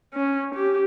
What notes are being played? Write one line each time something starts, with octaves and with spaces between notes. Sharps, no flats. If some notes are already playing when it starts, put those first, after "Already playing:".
C#4
G4